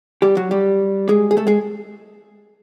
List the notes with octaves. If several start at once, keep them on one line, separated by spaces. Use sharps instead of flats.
G3 G4
F#3 F#4
G3 G4
G#3 G#4
G#4
A3 A4
G#3 G#4